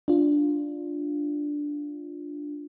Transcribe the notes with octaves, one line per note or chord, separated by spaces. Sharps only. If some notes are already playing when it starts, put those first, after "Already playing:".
D4 F4